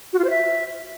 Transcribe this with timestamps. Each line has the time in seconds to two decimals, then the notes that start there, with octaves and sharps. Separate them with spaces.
0.13 F#4
0.19 F4
0.24 C5
0.30 E5